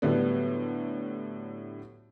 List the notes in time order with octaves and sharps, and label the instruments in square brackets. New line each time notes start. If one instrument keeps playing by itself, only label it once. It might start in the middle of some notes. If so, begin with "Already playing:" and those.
[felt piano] A2 D3 F#3 G3 B3